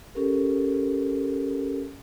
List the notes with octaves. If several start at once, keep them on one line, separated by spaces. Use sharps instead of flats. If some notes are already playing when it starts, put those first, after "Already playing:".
C#4 G4 A4 A#4